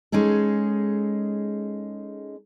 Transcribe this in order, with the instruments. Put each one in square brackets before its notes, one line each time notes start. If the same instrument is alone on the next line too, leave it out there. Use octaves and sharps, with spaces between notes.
[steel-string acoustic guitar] G#3 C#4 D#4 G#4 A4